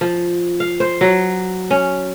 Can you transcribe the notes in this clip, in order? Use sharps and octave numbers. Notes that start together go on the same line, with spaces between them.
F3
F5
C5
F#3
C#4